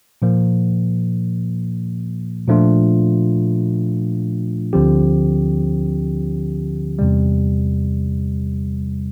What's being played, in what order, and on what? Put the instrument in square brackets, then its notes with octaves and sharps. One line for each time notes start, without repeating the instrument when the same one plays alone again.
[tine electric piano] A#2 F3 A#3
A#2 F3 A3 D4 F4
D2 D3 F3 C4 G4
E2 C3 G3